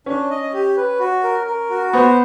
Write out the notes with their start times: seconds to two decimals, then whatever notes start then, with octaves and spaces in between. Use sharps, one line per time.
0.06 C#4 D4
0.30 D#5
0.54 G4
0.77 B4
1.00 F#4
1.23 A#4
1.47 A#4
1.70 F#4
1.93 B3 C5